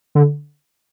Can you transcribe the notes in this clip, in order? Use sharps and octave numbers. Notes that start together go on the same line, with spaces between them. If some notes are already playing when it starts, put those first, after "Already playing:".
D3